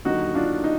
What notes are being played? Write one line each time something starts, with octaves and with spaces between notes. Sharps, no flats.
D#2 D3 F#3 D#4 F#4
D4 F4
D#4